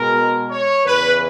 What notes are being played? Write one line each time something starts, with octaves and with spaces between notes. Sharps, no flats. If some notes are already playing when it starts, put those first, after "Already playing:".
Already playing: B2 G#3 A#4
C#5
E2 C#3 E3 B4